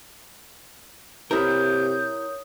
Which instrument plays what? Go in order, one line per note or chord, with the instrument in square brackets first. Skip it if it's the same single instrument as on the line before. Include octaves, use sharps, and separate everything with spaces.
[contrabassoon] C3 [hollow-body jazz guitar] E4 A#4 [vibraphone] C#5 D#6 [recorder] G6